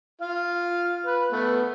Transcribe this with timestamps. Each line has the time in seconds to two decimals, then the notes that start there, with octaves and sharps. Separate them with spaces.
0.22 F4 F5
1.06 B4
1.32 A3 B3